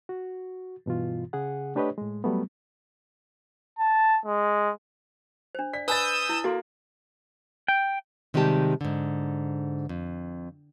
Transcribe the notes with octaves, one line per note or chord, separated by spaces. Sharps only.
F#4
G2 B2 E3 F4
C#3 G#4 F#5
A3 D4 G4 B4 C#5 D#5
A2 G#3
F#3 G3 A3 B3
A5
G#3
D4 C5
D5 B6
B4 G#5 D#6 E6 G6 A6
E4
A#3 F#4 A4 C6
G5
C3 D#3 G3 G#3 G4 A5
G#2 D3
F2